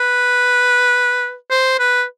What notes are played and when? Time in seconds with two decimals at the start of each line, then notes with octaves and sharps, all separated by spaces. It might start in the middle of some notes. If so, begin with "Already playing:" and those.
Already playing: B4
1.50 C5
1.79 B4